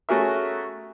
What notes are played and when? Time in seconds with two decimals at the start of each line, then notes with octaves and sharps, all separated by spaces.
0.09 A3 C#4 F#4 G#4 A#4 E5